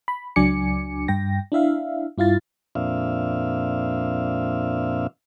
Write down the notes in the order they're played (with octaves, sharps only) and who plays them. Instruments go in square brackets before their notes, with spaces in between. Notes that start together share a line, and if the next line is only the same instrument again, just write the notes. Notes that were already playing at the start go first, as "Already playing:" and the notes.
[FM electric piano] B5
C#2 F#3 D4 G#5 D6 C#7
G2 G5 A#6
D4 E4 E5 F5
G2 E4 F4 F5 A6
[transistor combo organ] F2 A#2 C4 D4 E5 F5